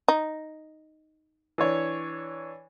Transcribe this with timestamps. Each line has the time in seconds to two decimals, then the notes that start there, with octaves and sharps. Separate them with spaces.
0.08 D#4
1.58 E3 D4 C#5